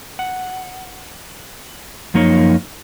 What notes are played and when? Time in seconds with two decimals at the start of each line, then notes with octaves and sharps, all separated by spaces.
0.19 F#5
2.14 F#2 F3 A#3 D#4 C#5